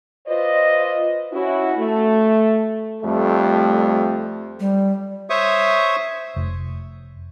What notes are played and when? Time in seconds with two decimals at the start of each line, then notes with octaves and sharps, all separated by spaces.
0.27 F4 B4 C5 D5 D#5
1.32 C#4 E4 F#4
1.78 A3
3.02 F2 G3 A3
4.60 G3
5.30 C5 C#5 E5 C#6 D#6
6.36 F1